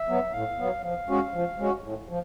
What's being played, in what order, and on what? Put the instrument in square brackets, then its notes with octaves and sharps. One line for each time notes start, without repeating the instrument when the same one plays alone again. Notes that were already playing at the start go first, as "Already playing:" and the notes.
Already playing: [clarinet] E5
[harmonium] F#3 B3
[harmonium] A2 [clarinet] F5
[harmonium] F#3 B3
[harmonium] F3 [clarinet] F5
[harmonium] G#3 C#4 F#4
F3
G#3 C#4 F#4
A2
F3